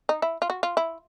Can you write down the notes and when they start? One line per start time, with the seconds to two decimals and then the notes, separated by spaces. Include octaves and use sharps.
0.09 D#4
0.22 E4
0.42 F4
0.50 F#4
0.63 F4
0.77 E4